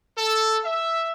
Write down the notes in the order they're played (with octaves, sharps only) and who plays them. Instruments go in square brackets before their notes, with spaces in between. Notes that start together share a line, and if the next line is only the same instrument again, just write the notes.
[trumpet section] A4
E5